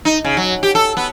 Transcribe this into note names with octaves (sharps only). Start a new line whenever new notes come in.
D#4
C#3
F#3
G4
A4
B3